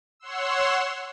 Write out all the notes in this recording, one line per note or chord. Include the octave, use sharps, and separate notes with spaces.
C#5 F#5 C6 E6